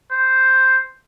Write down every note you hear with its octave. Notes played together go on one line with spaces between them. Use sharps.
C5